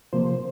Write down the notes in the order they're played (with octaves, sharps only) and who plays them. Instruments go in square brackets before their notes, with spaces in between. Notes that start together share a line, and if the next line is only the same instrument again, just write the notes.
[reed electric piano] C3 F3 A#3 C5